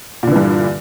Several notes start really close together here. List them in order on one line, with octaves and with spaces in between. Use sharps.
A#2 D3 E3 G2